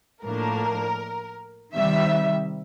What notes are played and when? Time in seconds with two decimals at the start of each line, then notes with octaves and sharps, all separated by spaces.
0.24 A2 F3 A#3 D4 A#4
1.75 C3 D#3 G3 E5